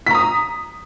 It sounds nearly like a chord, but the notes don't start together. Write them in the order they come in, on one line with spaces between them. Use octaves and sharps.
B6 A#5 D#6